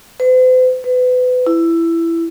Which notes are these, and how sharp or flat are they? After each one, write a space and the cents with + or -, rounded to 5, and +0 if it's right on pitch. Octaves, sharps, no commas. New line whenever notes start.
C5 -45
B4 +30
E4 +15